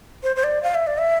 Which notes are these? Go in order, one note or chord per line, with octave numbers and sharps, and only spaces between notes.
C5
C5
D5
F5
E5
D5
E5